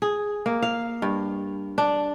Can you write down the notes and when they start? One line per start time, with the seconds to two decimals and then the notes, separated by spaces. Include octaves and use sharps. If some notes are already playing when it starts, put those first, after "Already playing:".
0.02 G#4
0.46 A#3
0.62 F5
1.02 G2
1.78 D4